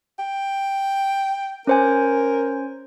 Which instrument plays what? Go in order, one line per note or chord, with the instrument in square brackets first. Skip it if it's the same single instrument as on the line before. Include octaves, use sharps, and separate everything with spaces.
[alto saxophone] G5
[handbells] C#4 C5 G#5 [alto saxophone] A#4